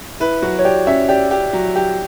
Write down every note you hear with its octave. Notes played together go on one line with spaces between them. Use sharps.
E4 B4
F#3 F#4
C#5
G4 D5
C#4 E5
G4 D5
G4
F#3
G4